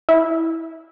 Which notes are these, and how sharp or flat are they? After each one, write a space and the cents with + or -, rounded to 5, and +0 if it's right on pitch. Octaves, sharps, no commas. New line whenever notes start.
E4 -10